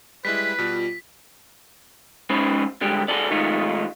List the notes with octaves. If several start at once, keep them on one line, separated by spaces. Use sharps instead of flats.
G3 G#3 E4 B4 B6
B2 G3 F4
G#3 B3 C#4 D#4 C5 B5
D3 G3 G#3 G4
F#4 G#4 A4 D5
D#3 G#3 A3 D#4 F4